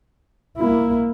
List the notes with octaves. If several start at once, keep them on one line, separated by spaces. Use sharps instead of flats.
A#3 E4